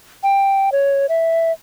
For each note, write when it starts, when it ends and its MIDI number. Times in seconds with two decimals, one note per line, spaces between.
0.23 0.72 79
0.72 1.06 73
1.09 1.52 76